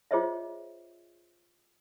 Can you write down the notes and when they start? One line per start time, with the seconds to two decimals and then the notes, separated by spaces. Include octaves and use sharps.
0.11 F4 G#4 C5 C#5 D#5 E5